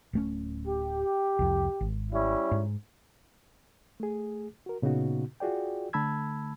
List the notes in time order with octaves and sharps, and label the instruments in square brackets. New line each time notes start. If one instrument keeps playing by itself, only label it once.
[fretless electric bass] D1 A3 C#4
[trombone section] G4
[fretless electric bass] C2 F2
G#1
[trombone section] G3 C#4 E4
[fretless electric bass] G#2
[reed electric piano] A3 G#4
F#4 A#4
A#2 C#3 B3 D#4 F#4
F4 F#4 G#4 D5 G5
D3 A3 A5 B5 E6 G#6